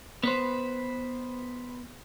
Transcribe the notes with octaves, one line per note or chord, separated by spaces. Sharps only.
B3 B4 C5